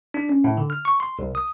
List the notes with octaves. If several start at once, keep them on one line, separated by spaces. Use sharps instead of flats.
D4
C#4
A2
D3
F6
C#6
C6
C2
D#6